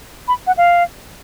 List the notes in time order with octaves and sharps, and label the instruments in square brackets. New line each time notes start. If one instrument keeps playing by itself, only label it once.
[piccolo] B5
F#5
F5